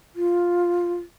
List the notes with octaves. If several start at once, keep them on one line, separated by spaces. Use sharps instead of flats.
F4